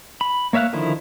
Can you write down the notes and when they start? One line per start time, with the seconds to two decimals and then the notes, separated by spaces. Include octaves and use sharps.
0.21 B5
0.53 A#3 C#5 E5 F5 F#6
0.73 D3 D#3 F3 E4